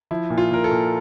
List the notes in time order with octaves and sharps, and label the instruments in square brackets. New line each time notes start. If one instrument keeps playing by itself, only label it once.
[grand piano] F3 E4
A#2
F4
A#2 A#4
A4
A#2